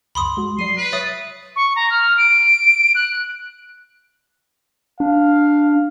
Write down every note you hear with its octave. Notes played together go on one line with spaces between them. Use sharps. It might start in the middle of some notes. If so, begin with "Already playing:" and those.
C#2 F#2 B5 C6 D#6
G#3 F#4
F#3 D5 C6 D#7
B4
C#5 E5 D#6 A6
C#6
A#5
F6
D7
F#6
D4 F5